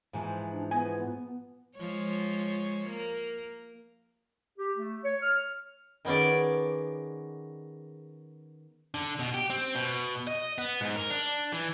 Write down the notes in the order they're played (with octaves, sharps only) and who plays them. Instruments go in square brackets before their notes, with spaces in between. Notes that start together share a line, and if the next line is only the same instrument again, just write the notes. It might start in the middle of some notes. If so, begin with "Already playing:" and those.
[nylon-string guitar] G#2 E3 F3
[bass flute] D4
[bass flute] B3 [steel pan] G#5
[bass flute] B3
[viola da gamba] F3 G#3 C#5
A#3 A#4
[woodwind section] G4
A3
C#5
F6
[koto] D#3 B3 C#4 G#4 D5
[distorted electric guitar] D3
B2
G4
C4
B2
D#5
B3
G#2
A#4
D4
E3